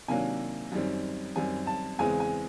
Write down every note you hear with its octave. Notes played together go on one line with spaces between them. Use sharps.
C3 D#3 F#3 A#3 D4 G#5
F#2 D#3 G3 C4
F#2 D#3 G3 C4 G#5
A5
E2 C#3 E3 G#3 C4 G#5
G#5